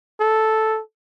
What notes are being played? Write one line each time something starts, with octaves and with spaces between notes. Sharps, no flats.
A4